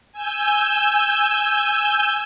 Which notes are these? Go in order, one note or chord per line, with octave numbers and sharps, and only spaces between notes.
G#5 E6 G6